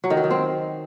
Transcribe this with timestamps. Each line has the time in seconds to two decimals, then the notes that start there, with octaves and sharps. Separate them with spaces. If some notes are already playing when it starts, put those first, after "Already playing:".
0.04 F#3
0.10 D#3
0.17 F#3
0.24 D#3
0.31 C4